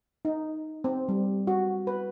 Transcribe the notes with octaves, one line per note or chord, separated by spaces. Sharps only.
D#4
C4
G3
F#4
B4